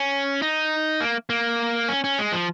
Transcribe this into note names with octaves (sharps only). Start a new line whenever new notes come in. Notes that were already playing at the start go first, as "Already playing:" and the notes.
Already playing: C#4
D#4
A#3
A#3
C#4
C#4
G#3
F3